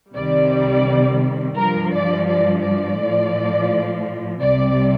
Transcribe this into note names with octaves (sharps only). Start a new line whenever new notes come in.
C2 C3 D#3 G3 D5
G2 F3 A#4
D5
D5
D5
A2 F3
C2 C3 G3 D5